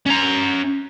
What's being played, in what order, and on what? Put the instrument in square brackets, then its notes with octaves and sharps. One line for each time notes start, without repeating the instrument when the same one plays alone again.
[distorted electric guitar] C#4 A#5